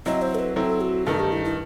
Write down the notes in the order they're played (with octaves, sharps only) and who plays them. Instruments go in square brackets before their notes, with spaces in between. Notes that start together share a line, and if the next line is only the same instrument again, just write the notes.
[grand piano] F#3 C4 E4 [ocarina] D#5
[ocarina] C5
A4
B4
[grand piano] F#3 C4 E4 [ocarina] A4
[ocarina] F#4
[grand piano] G2 D#3 A3 D#4 [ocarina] A4
[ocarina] G4
E4
E4